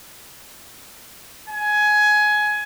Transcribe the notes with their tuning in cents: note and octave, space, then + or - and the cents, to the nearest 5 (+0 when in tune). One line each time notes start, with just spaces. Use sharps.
G#5 +15